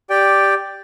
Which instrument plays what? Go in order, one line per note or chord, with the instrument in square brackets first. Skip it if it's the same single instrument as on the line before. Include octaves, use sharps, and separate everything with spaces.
[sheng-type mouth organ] G4 D5 G5